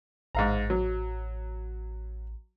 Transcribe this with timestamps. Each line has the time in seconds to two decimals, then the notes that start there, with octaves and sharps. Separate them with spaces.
0.35 A1 G#2 F5 A#5
0.70 F#3